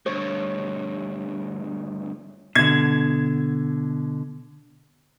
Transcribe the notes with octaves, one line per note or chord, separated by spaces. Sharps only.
D2 G2 C#5
B2 D3 G#6